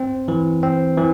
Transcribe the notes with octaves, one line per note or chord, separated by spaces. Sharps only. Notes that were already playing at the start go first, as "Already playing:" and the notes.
Already playing: C4
E3
C4
E3